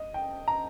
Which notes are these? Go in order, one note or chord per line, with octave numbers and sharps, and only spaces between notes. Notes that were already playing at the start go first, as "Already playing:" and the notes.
Already playing: D#5
G5
A#5